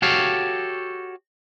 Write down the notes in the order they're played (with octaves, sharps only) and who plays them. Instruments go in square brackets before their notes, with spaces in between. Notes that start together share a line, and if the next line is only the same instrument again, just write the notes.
[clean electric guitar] F#4 G4 A4 C#5 F5